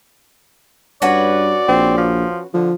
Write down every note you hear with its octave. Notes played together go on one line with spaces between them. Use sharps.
G2 C#4 F#4 B4 D5
A#1 C4
F3
D3 F3